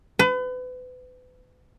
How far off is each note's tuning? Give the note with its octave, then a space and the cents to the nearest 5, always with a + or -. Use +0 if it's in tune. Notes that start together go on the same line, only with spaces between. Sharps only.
B4 +35